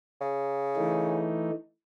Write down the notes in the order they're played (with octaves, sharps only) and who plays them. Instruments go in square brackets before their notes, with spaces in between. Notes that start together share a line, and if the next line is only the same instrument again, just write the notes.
[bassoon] C#3
[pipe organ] E3 A3 D#4